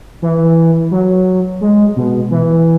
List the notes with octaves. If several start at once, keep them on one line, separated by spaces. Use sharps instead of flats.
E3
F#3
G#3
B2
E3